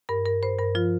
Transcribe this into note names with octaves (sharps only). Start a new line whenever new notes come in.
G2 A#4
G2 A#4
G2 C5
G2 A#4
F3 F4